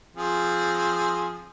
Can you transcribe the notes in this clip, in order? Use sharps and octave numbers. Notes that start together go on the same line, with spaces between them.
F3 C4 G#4